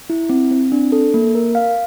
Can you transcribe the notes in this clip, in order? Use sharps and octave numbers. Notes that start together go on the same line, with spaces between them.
E4
C4
C4
D4
A4
A#3
A#4
F5